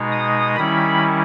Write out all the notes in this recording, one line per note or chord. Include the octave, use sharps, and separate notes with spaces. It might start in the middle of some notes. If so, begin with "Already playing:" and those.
Already playing: B2 G#3 D#4
D#6
D#3 G3 C#4 E4 B5